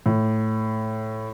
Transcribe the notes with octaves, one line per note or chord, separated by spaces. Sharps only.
A2